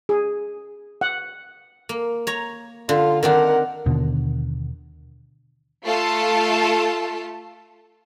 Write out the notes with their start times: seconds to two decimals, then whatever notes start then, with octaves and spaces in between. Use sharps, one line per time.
0.09 G#4
1.01 F#5
1.89 A#3
2.27 C#5 A#5
2.89 D3 F4
3.23 D#3 C4 D4 A#4 F#5
3.86 D#2 B2 D3
5.84 A3 F4 A4 A5